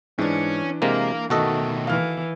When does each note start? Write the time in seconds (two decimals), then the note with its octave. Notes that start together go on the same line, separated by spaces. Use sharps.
0.19 G#2 E3 C#4 D4
0.82 C3 G#3 A#3 A#4 F5
1.30 B2 D#3 A3 F#4 A4 D#5
1.87 E3 F5 F6